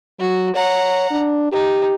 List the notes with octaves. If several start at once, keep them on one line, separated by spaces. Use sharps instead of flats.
F#3 F#4
C#5 F#5 A#5
D4
D#4 G4